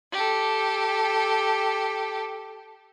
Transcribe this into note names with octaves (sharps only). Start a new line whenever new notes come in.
G4 A4